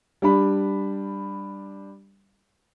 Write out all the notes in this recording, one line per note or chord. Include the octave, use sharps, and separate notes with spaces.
G3 D4 B5